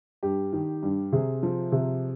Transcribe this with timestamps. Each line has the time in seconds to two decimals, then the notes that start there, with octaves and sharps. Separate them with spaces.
0.23 G2 G4
0.53 D#3
0.83 G2
1.13 C3 G#4
1.43 F3
1.72 C3